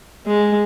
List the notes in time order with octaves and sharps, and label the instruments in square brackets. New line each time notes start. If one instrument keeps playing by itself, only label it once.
[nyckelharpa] G#3